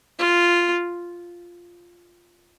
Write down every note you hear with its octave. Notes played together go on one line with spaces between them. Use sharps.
F4